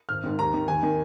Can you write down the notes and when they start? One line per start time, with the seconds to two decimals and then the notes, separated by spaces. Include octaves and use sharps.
0.09 G#1 F6
0.24 G#2 D#3
0.39 D#2 A#5
0.54 D#3
0.68 D#2 G#5
0.83 D#3